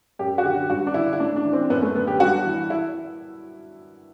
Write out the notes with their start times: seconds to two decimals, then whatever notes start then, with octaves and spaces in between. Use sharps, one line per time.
0.19 F#2 G4
0.38 F#4
0.44 D3 G4
0.69 G2 F#4
0.87 D4
0.94 D3 E4
1.13 E4
1.20 A2 D4
1.36 D4
1.45 E3
1.53 C4
1.70 F#2 B3
1.82 A3
1.95 D3 B3
2.07 G4
2.20 G2 F#4
2.45 E3
2.70 E4